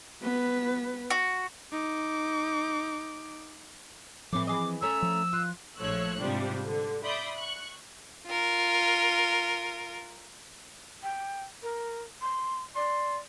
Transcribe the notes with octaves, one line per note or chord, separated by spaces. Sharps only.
B3 B4
F#4
D#4 D6
A2 E3 F3 C4 D6
E3 G#4 D#5 D6
A3 C#4 A#5 E6
F3
F4 F#6
A#1 F3 A3 C#5 E6 F#6
G#2 C3 F3 G3 D4
D3
D5 E5 B5 C6 D#6 G6
C#6 F#6
F4 A#4
G5
A#4
C6
D5 C6